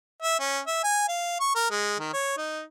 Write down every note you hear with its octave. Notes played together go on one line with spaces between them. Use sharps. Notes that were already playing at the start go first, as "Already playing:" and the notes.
E5
C#4
E5
G#5
F5
C#6
A#4
G#3
D#3
C#5
D#4